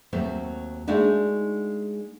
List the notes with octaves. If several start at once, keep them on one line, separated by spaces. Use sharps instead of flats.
D#2 F#3 A3 C4
G#3 A3 D4 D#4 F#4